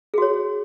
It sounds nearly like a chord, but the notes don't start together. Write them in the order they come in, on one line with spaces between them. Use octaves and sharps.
G#4 F#4 C#5